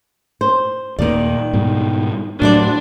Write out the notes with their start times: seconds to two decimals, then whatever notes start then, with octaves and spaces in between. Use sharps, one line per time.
0.41 C5
0.99 D#2 A#2 D#3 D5
1.53 G#2 B2 G3
2.42 A2 F#3 G3 D4 F#4 C5 D5